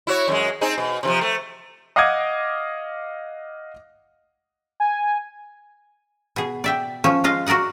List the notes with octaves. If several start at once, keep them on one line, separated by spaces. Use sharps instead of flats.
E4 F#4 C#5
F#2 G3 G#3
C4 D#4 G#4
B2
C3 E3 F3
A3
D#5 F5 F#5 D6 D#6 G#6
G#5
B2 G#4
D5 E5 G5
F3 C#4 C#5
G#3 F4 D#5 F5
F#4 A#4 D5 D#5 F#5